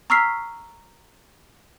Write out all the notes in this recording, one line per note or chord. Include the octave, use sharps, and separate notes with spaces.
A#5 C#6 E6 F6 B6 C7